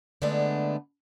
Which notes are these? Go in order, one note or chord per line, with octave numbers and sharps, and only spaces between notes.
D3 G#3 A3 B3 D4